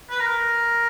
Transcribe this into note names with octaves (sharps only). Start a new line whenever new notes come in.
B4
A#4